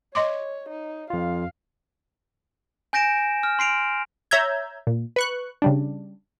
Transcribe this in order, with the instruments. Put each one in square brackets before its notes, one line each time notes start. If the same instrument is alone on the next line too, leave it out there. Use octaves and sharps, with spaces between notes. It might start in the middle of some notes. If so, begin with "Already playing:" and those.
[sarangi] C#5 [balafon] D#5 C6 D6
[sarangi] D#4
[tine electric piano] F2 F4 [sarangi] F5
[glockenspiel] G#5 G6 A#6 D7 E7
F6
C6 C7 D7 F7
[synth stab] C#5 E5 A#5 E6 G6 G#6
A#2
B4 C#6 F#6
C#3 G3 D4